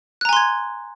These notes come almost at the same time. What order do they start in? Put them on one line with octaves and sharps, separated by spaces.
F#6 A#5 G#5 C6 G#6